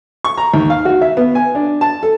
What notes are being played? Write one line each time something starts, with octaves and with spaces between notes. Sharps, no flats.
C#6
A#5
D#2
F5
F#4
E5
B3
G#5
D4
A5
A4